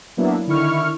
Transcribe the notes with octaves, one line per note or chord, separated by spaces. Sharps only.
F#3 A#3 B3 D4 E4
D3 D#3 E4 C#6 F6